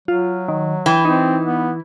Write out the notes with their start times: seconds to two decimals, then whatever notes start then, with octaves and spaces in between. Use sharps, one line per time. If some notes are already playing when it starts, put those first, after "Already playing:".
0.08 F#3 F4
0.48 D#3
0.86 E3 G5
1.05 C4 D#4
1.45 B3